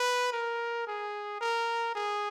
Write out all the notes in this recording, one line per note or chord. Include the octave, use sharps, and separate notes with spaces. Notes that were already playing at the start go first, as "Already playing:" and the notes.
Already playing: B4
A#4
G#4
A#4
G#4